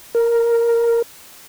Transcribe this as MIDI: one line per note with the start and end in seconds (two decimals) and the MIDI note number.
0.15 1.02 70